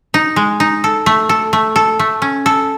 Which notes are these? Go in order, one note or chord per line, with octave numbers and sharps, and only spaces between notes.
D#4
G#3
D#4
A4
A3
A4
A3
A4
A3
C#4
A4